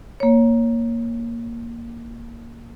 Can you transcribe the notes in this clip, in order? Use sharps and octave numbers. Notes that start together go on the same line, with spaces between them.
A#3 C#5